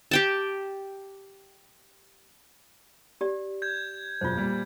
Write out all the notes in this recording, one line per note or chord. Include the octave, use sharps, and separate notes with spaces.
G4 G5 A5
G4 D5
G6 G#6
E1 F#2 F4 C5
A#2 G3